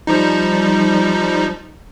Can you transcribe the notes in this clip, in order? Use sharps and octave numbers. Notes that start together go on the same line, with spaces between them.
F3 G3 D#4